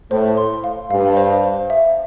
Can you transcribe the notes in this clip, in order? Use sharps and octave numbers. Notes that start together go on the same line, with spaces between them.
A2 C5
C6
F5
G2 F5
C5
C5
E5